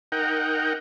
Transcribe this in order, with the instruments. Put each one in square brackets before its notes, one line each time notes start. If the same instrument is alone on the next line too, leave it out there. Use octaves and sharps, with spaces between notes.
[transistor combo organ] D#4 A#4 F#5 G5